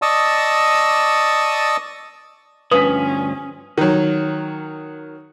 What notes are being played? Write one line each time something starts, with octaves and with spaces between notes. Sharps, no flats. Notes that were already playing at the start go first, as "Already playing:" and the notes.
D5 D#5 A5 C#6 D#6 E6
D2 G2 F3 C#4 B4 D#6 B6
D#3 F#3